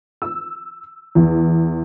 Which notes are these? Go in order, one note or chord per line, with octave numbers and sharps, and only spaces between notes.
E6
E2